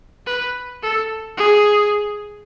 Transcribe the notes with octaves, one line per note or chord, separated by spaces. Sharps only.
B4
A4
G#4